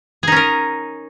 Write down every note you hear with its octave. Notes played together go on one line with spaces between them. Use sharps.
C#4 D#4 G#4 A#4